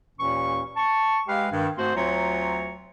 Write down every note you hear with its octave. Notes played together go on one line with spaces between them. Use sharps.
D#2 A#2 E3 C#4 C#6
A5 C#6
G#3 G4 B4 F5
G2 D#3
G#2 A3 C4 F#4 C5 C6
D2 F#3 C4 F4 C#5 A#5